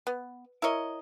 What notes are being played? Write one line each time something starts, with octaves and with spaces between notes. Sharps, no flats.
B3
E4 A#4 C#5 D#5